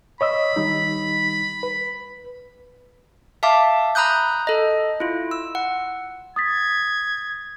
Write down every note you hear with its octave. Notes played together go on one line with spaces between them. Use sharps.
C#5 D#5 B5 E6
D#3 G3 D#4
B4
E5 F5 A5 D6
A#5 B5 D#6 F#6 G6
A4 D#5
E4 F4
E6
F#5
D#6 G#6 A6 B6